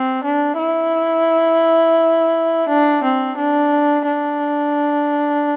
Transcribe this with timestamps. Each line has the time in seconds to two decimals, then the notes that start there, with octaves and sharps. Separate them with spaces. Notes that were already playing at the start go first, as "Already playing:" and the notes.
Already playing: C4
0.23 D4
0.59 E4
2.69 D4
3.03 C4
3.37 D4
4.07 D4